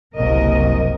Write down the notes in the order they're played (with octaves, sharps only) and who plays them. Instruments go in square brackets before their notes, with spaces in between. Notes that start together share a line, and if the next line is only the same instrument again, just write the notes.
[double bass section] F#1 C2 [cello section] A#4 D#5